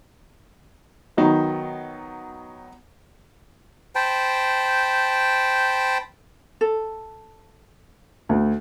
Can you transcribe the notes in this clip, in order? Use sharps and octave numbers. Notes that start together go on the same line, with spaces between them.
D#3 F#3 B3 D#4
C5 G5 A5 B5
A4
D2